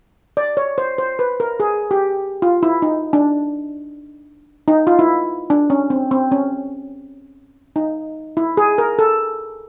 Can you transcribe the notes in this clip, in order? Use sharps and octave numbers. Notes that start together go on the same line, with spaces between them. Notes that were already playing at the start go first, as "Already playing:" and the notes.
D5
C#5
C5
C5
B4
A#4
G#4
G4
F4
E4
D#4
D4
D#4
F4
E4
D4
C#4
C4
C4
C#4
D#4
E4
G#4
A#4
A4